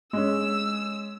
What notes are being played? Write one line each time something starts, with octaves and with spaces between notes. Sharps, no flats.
G#3 C#4 E6